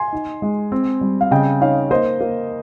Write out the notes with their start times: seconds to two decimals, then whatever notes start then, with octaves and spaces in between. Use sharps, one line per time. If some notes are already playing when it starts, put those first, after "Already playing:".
Already playing: G#5 C6
0.13 D#4
0.42 G#3
0.72 C4
1.01 G3
1.21 F5
1.31 C#3 D#5 G5
1.61 D#4 C#5 F5
1.91 A#3 C5 D#5
2.21 A#3